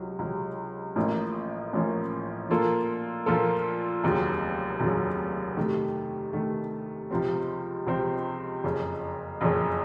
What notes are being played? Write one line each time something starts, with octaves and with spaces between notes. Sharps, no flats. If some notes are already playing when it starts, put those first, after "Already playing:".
Already playing: C#2 C3 F#3
C#2 C3 F#3
A1 A2 F3 A#3 C#4
A1 A2 F3 A#3 C#4
A#2 F3 A#3 F4 A4
A#2 F3 A#3 F4 A4
F1 D#2 C#3 F#3
F1 D#2 C#3 F#3
C3 D#3 A3
C3 D#3 A3
C#2 C3 F3 C4
C#2 C3 F3 C4
F#1 F2 C#3
F#1 F2 C#3